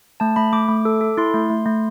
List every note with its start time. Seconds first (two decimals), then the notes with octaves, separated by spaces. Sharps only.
0.20 A3 A5
0.36 A3 B5
0.53 A3 D6
0.68 A3
0.85 A4
1.01 A4
1.17 E4 C6
1.34 A3
1.50 A3
1.66 A3